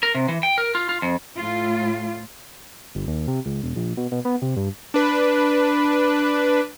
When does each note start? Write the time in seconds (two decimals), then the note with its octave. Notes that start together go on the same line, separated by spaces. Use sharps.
0.03 A#4
0.15 C3
0.28 E3
0.43 G5
0.58 A#4
0.75 F4
0.89 F4
1.02 F2
1.36 A2 F4
2.95 G1
3.07 D#2
3.28 C3
3.46 C#2
3.63 E1
3.76 A#1
3.97 B2
4.12 B2
4.25 B3
4.42 C3
4.56 G2
4.94 D4 B4